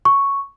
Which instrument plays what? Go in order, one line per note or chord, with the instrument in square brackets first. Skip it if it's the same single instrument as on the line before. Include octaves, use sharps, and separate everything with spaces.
[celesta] C#6